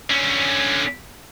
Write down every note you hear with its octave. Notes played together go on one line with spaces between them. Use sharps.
D3 C#4